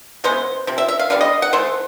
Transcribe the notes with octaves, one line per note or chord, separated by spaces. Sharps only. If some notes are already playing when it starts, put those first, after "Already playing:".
C#3 E3 G#3 B3 C5
C3 F3
E5
E5
F5
D3 G3 B3 F5
D#5
F#5
E3 A3 C5